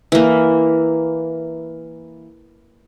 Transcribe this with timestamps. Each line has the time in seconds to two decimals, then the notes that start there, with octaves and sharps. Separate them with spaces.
0.12 E3 A#3